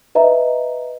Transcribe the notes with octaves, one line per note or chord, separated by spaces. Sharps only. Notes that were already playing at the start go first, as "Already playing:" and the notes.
B4 D#5 E5 A#5